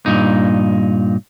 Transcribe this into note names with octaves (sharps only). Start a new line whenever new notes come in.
G2 A#2 D#4